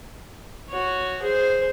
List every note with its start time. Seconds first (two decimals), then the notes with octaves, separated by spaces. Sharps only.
0.69 F#4 C#5
1.22 G#4 C5